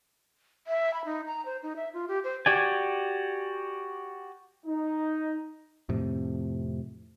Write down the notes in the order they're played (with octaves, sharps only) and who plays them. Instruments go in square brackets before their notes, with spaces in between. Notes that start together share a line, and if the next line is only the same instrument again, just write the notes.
[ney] E5
B5
D#4
A#5
C5
D#4
E5
F4
G4
C5
[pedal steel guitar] F#4 G4 D5 G#5
[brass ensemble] D#4
[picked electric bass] F2 A2 C3